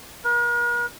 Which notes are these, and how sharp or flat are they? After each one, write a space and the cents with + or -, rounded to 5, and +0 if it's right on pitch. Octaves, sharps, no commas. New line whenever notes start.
A#4 +45